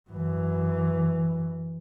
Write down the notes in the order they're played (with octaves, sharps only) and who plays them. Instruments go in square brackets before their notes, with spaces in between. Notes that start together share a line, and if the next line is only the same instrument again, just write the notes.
[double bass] F#2 E3